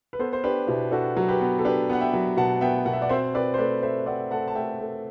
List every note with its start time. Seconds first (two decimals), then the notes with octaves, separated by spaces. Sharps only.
0.13 B4
0.19 B3 A4 C5
0.33 C5
0.44 D4 G4 B4
0.67 B2 E4 G4
0.91 D4 F#4 A4
1.17 F#3
1.29 G4 B4
1.41 B3
1.59 A4
1.65 D4 G4 B4
1.89 B3 F#5
2.01 E5 G5
2.13 F#3
2.37 B2 F#5 A5
2.61 B3 E5 G5
2.86 B2 F#5
2.93 E5
3.02 D5 F#5
3.09 C4 C5 E5
3.34 C4 B4 D5
3.54 C5
3.58 A3 B4 D5
3.83 A3 C5 E5
4.06 C4 D5 F#5
4.31 A3 F#5 A5
4.48 A5
4.55 A3 E5 G5
4.79 A3